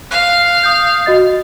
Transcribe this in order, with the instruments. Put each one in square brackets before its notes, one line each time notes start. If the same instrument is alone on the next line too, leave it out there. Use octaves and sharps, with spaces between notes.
[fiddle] F5 [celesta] F#6
[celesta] D#6 G6
F#4 D#5 A6